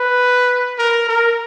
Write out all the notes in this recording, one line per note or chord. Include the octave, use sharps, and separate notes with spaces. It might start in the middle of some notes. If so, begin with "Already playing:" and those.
Already playing: B4
A#4
A#4